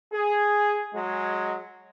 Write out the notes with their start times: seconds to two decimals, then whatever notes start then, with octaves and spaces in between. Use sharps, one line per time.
0.13 G#4
0.95 F#3 G#3